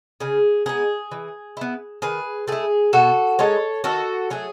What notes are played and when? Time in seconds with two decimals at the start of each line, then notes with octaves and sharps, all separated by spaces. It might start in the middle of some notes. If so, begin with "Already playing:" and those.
0.20 C#3 G#4
0.66 G#3 B3 D#4 G#4
1.11 E3
1.57 B3 E4
2.02 D#3 G#4 B4
2.48 A3 E4 G#4
2.93 B2 F#4 A4
3.39 G#3 D#4 A4 C#5
3.84 D#3 F#4 A4
4.30 F#3 A3 G#4